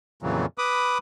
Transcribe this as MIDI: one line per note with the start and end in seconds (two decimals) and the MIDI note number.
0.22 0.46 41
0.22 0.46 46
0.22 0.46 49
0.22 0.46 52
0.22 0.46 54
0.58 0.98 71
0.58 0.98 83
0.58 0.98 86
0.58 0.98 87